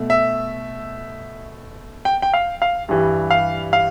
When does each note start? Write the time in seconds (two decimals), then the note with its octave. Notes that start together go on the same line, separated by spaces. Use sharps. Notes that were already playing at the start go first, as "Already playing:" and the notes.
Already playing: B2 A3
0.10 E5
2.05 G5
2.22 G5
2.33 F5
2.62 F5
2.89 G2 E3 G3
3.30 F5
3.73 F5